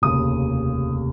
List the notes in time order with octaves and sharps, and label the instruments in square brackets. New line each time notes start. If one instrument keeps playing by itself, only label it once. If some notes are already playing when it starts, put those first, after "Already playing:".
[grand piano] F1 D#2 C#3 D#6